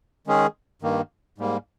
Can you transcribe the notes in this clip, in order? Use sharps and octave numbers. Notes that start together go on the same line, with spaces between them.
D#3 G#3 C#4 G#4
G2 D#3 A#3
G#2 G3 A#3